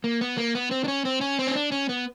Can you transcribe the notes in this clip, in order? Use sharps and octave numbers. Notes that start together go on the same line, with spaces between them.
A#3
B3
A#3
B3
C4
D4
C#4
C4
C#4
C4
C#4
D4
C#4
B3